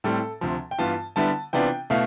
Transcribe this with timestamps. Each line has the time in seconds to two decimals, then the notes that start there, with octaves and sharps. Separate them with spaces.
0.04 A2 G3 C4 A4
0.41 D2 C3 F3
0.71 G5
0.79 G2 E3 B3 F4 A5
1.16 D3 G3 B3 E4 A5
1.53 C3 E3 B3 D4 F4 G5
1.90 B2 A3 E4 F5